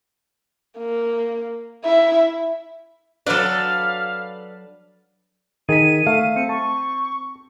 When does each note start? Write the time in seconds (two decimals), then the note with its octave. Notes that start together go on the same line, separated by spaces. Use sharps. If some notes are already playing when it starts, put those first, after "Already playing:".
0.78 A#3
1.84 E4 E5
3.26 F#3 D4 A4 B4 D5 F5
5.69 D#3 G#4 B6 D#7
6.07 A3 F5
6.36 C4 C#7
6.49 A5 C#6